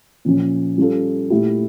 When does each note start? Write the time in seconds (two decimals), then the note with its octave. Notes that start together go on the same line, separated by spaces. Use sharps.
0.25 A#2 F3 C#4
0.78 G3 C#4 F4 A4
1.30 A#2 A3 E4 G4